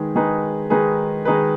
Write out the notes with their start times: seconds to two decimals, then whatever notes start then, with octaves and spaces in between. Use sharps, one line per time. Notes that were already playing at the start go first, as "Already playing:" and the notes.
Already playing: D#3 G#3 D#4 G#4 B4
0.15 D#3 G#3 D#4 G#4 B4
0.70 D#3 G#3 D#4 G#4 B4
1.25 D#3 G#3 D#4 G#4 B4